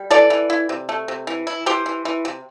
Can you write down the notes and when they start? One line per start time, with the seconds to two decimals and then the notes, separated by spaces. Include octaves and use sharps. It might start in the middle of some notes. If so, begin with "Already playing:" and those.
Already playing: G3
0.10 E3 A4 D5
0.30 E3
0.50 E4
0.69 C3
0.89 A3
1.08 C3
1.27 E3
1.47 E4
1.66 E3 G4 C5
1.86 E3
2.05 E3
2.25 C3